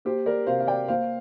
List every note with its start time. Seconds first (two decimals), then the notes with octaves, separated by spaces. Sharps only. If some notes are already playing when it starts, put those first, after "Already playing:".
0.05 A#3 G4 C5
0.26 A#4 D5
0.47 C3 C5 F5
0.60 F5
0.67 D5 G5
0.88 A#3 C5 F5